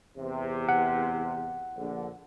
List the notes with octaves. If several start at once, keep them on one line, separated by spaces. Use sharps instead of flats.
E2 C3
F#5
A#1 D3